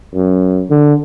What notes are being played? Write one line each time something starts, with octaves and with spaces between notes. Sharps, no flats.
F#2
D3